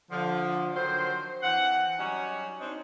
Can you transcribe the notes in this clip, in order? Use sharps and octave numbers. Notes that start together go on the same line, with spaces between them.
D3 F3
D3 D#3 F#3 C5
E3 C4 F#5
F#3 G3 C#4 D#4 C#5
C4 D4 D#4